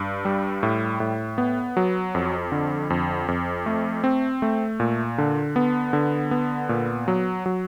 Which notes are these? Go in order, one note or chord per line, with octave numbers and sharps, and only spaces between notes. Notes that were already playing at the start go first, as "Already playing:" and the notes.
Already playing: G2
G3
A2
A2
B3
F#3
F2
D3
F2
F2
A3
C4
A3
A#2
D3
B3
D3
B3
A#2
F#3
F#3